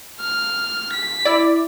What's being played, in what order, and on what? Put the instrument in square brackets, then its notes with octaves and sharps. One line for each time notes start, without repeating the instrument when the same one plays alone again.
[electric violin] F6
B6
[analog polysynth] E4 D5